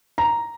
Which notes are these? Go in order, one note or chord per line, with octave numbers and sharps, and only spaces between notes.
A#5